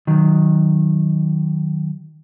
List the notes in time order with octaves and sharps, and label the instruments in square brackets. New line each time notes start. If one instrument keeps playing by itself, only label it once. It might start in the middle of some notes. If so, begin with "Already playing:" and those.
[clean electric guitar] D#3 F#3